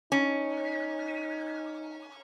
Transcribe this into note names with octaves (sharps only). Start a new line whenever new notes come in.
C#4 D#4